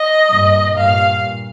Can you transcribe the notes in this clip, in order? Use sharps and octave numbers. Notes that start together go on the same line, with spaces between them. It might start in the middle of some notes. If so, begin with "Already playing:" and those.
Already playing: D#5
G2 A#2
G2 A#2 F5